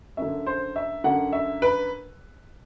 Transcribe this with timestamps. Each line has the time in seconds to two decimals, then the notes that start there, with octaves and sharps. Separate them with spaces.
0.17 F#2 D3 E5
0.46 C5
0.76 E5
1.04 F#2 D3 F#5
1.33 E5
1.62 B4